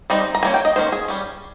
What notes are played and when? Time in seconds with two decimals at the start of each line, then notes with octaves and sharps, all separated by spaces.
0.10 G3 C4 D#4
0.35 A#5
0.43 G3 A#3 C#4 G#5
0.54 G5
0.65 D#5
0.76 D#3 A#3 C#4 C5
0.92 G#4
1.08 G3 C#4